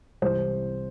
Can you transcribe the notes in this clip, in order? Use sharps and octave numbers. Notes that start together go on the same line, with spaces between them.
C2 C3 E3 C5